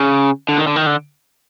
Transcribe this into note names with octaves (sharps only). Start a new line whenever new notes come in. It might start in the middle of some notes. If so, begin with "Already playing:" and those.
Already playing: C#3
D3
D#3
D3
D#3
D3